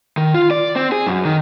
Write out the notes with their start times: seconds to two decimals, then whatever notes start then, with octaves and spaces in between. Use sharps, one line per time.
0.17 D#3
0.34 F4
0.51 D5
0.76 C4
0.92 G#4
1.07 F#2
1.25 D#3